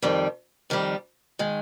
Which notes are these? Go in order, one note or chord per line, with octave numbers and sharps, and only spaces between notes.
F2 D#3 G3
F2 D#3 G3
D#3 G#3